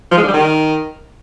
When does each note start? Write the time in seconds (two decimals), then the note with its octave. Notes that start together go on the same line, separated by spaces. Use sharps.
0.12 F3
0.17 G#3
0.23 D3
0.28 G3
0.34 D#3